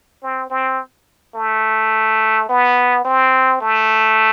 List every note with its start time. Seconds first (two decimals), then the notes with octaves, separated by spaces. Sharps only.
0.23 C4
0.50 C4
1.35 A3
2.49 B3
3.05 C4
3.61 A3